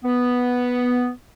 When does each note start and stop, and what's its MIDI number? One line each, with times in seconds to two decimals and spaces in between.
0.04 1.09 59